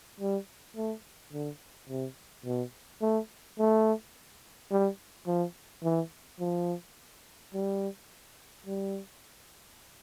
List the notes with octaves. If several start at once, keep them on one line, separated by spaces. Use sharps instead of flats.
G3
A3
D3
C3
B2
A3
A3
G3
F3
E3
F3
G3
G3